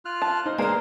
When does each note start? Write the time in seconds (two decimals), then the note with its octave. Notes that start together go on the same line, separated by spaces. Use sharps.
0.05 F4 F6 F#6
0.22 A5
0.46 D#4 C5
0.59 G#3 A#3 B3 C5 D5 A#5